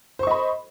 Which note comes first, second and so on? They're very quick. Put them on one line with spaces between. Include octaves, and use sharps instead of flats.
C5 C#6 D#5 B5